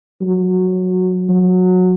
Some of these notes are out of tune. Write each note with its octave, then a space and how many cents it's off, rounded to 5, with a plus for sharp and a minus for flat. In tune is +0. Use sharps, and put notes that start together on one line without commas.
F#3 -10
F#3 -20